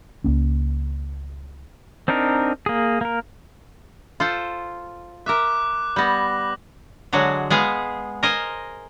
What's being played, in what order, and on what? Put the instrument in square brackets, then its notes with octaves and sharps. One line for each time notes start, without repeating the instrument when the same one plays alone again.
[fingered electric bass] C#2 A#3 C#4
[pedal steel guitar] C4 D4 D#4 A#4
A#3 G#4
A#3 A#4
[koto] F4 A4 C5
[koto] A#4 E5 [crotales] D6 F#6
[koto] G3 B3 [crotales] A#6 F#7
[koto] D3 F#3 G#3 F#4
G#3 B3 G#4 F5
A#4 C5 D#5 G#5